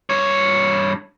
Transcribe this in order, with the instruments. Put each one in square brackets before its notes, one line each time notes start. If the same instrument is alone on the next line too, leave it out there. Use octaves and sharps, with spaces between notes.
[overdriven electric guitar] G2 C#5